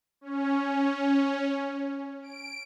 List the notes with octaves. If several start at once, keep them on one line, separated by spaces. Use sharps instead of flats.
C#4
D7